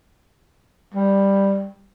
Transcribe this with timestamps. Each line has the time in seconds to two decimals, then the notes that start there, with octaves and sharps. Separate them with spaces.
0.94 G3